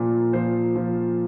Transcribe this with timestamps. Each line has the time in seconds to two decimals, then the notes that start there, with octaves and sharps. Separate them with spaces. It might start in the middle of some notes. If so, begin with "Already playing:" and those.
Already playing: A#2 F3
0.33 F3 C5
0.76 F3